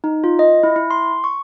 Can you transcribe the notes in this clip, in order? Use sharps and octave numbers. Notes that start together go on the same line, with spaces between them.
D#4
F4
D#5
E4
E4
C6
C#6